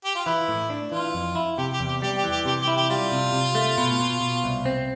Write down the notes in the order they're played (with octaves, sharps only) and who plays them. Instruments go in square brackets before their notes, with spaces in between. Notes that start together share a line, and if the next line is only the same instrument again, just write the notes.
[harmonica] G4
F4
[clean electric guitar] E3 [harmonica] E4
[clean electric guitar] A2
D4
[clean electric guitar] E3 [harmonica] F4
[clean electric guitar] F2
E4
[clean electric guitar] C3 [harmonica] G4
[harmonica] G4
[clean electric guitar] E2
[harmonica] G4
[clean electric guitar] G3 [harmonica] G4
[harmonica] G4
[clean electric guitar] E3
[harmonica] G4
[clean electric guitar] C3 [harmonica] G4
[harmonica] G4
[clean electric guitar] E4
[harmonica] G4
[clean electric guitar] G3 [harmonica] F4
[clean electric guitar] C3
C3
A3
B2
B2
B2
C2
C4